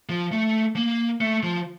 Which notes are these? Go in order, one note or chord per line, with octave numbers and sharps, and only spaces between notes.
F3
A3
A#3
A3
F3